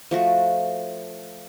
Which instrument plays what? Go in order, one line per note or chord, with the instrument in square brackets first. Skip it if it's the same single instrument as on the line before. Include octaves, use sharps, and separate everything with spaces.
[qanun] F3 A3 F#4